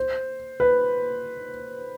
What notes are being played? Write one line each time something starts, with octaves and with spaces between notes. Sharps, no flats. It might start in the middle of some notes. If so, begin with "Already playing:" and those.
Already playing: C5
B4